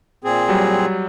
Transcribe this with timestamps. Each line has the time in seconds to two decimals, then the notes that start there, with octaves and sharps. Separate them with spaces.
0.24 A#2 C4 G#4
0.49 F#3 G3